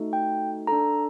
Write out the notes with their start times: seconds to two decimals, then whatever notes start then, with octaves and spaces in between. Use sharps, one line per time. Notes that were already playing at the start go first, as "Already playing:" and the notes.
Already playing: A3 D#4 F#4 A4
0.13 G5
0.67 D4 A4 A#5